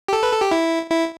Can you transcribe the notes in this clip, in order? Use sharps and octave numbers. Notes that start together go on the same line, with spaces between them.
G4
A4
B4
A4
G4
E4
E4